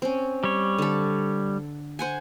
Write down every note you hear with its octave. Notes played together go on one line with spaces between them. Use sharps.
C4 C#4
G3 C#5
D3 A4
C5 F#5 G#5